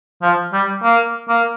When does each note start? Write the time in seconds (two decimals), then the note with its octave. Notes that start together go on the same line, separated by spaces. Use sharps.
0.22 F3
0.53 G3
0.83 A#3
1.29 A#3